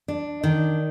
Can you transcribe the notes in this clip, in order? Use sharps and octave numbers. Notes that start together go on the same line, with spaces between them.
D4
D#3